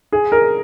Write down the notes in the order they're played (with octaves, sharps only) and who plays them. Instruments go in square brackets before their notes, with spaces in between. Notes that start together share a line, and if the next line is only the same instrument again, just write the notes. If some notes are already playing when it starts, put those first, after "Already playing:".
[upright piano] G#4
A#4